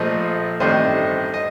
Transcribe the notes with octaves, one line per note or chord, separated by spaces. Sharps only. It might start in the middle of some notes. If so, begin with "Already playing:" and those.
Already playing: A#1 A#2 F3 A3 C5 D#5
A1 G2 D#3 A3 C4 C5 D#5
D#5